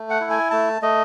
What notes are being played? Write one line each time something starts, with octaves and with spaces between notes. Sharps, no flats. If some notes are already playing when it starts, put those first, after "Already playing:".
Already playing: A3
F#5
E4
G#5
A3 A5
A3 D#5